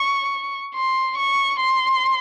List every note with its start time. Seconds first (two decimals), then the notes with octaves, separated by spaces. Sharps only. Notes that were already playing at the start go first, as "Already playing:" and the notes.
Already playing: C#6
0.75 C6
1.18 C#6
1.60 C6